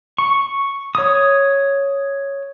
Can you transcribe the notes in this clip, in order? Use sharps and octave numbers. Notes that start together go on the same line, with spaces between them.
C#6
C#5 D#6